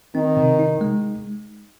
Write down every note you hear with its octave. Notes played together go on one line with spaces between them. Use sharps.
D#3 C4
C3
D#4
G#3